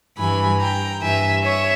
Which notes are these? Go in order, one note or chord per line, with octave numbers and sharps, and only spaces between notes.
G2 E3 G#5 B5
G5 A#5
G2 E3 E5 G#5
C#5 E5